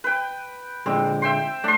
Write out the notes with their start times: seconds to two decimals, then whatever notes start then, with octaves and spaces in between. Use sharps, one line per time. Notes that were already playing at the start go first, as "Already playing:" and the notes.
0.04 B4 G5
0.86 A#2 D3 G#3 C4
1.22 E5 G5 C6
1.64 A3 D4 C6